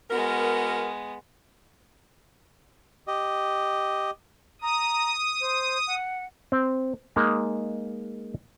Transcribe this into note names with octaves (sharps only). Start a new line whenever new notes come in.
G#3 B3 F#4 A#4
G4 D#5
A#5 D#6
C5
F#5
C4
G#3 A#3 D#4